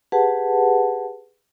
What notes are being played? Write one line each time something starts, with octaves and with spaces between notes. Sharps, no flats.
G4 G#4 B4 F#5 A5